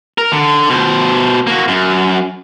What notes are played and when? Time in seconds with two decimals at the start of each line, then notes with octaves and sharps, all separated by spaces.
0.18 A#4
0.33 D3
0.69 B2 C5
1.47 A#3 F#4
1.68 F#2